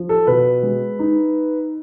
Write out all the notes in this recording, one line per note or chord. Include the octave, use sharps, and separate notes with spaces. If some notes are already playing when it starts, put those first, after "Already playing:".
Already playing: F3
A4
B2 B4
G#3
D#4